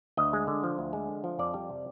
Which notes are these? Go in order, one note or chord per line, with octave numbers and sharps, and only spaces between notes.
D2 D#5
G#3
D3
F3
D2
G#3
D3
F3
F2 D5
G3
C3